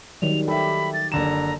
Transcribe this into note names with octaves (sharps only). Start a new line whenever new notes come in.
D#3 F#3 G3 F7
G4 A4 E5 B5
A6
F#1 D3 A#5 E7